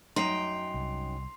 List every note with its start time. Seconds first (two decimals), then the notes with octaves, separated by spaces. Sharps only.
0.16 F#2 D#4 G5 C6 C7 F7
0.74 C2